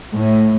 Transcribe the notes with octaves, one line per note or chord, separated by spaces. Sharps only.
A2